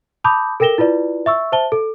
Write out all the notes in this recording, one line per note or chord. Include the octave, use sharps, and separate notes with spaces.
A5 B5 D6 D#6 G6
A4 A#4 G5 A#6 E7 G7
E4 F4 B4 D5
E5 C#6 E6
C5 E5 A5 G7
A4